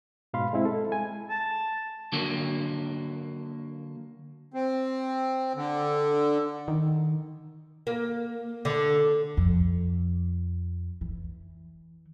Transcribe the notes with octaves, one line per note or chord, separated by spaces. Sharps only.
G#2 B2 F5 B5 C6
G#3 C4 E4
A4
G#3 G#5
A5
D3 F#3 A#3
C4
D3
D#3
A#3
D3
F2
E3